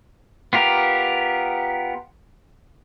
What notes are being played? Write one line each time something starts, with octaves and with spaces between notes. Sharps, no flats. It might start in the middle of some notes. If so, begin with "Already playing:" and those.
B3 F4 G4 A#4